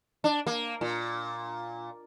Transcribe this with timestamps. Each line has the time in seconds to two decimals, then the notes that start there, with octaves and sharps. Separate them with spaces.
0.24 D4
0.47 A#3
0.81 A#2